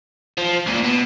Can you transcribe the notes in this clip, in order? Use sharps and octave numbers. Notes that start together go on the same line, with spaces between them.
F3
C#2 A#2
B2